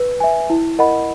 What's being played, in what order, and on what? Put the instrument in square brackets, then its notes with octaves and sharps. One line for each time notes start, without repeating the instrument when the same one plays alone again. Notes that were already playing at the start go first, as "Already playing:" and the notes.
Already playing: [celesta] B4
E5 G#5
E4
A#4 D#5 F#5 B5